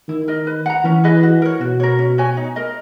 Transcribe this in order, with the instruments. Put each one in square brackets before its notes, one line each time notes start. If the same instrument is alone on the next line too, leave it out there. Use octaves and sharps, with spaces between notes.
[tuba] D#3 [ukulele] E4
[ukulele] A#4 D#5
B4
F#5 A#5
[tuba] E3 [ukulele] C#4
[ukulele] G#4 B4 D#5
F#4
A#4 C#5
[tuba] B2 [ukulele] F#4
[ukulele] A#4 C#5
C#4
F#4 C#5 G#5
D#4
A#4 D#5